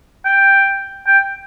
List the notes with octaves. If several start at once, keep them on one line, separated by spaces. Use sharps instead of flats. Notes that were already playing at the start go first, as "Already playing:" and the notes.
G5
G5